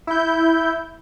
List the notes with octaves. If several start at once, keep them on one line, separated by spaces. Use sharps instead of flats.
E4 G6